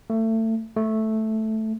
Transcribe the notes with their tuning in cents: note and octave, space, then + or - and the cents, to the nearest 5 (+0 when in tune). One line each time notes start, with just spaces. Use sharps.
A3 +25
A3 -5